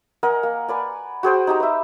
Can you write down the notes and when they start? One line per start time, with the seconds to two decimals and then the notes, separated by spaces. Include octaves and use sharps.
0.23 A#4 D#5 F#5 G#5
0.43 A#3
0.68 B4 D5 G#5
1.23 F#4 G#4 C5 G5
1.47 D#4 G4 A#5
1.60 B4 E5